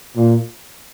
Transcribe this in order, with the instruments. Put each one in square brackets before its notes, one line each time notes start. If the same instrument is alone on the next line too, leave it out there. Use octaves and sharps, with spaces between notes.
[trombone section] A#2